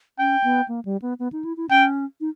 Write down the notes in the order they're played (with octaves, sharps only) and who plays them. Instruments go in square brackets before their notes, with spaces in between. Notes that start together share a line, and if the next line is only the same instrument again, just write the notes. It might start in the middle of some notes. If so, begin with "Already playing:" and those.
[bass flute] C#4 [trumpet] G5
[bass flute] B3
A#3
G3
B3
B3
D#4
E4
E4
[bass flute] C#4 [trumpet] G5
[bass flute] D#4